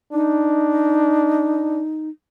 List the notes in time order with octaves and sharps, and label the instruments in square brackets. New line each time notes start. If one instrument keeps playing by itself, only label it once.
[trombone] D4 [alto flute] D#4